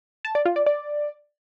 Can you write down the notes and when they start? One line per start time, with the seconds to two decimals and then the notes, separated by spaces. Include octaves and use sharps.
0.25 A5
0.35 D5
0.46 F4
0.56 D5
0.66 D5